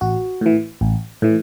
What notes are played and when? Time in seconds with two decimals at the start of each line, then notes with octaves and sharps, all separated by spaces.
0.01 A1 F#4
0.41 A2 E3
0.81 A1
1.22 A2 E3